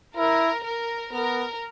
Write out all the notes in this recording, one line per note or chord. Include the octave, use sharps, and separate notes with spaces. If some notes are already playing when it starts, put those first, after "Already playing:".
E4 A#4
A#4
B3 A#4